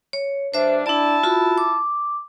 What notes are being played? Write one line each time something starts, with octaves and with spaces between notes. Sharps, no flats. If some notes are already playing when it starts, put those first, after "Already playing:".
C#5
G2 G3 D4 C5 E5
D4 E4 D5 A5
F4 F#4 B5
D6